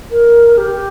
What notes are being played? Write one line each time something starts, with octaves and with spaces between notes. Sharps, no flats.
A#4
G4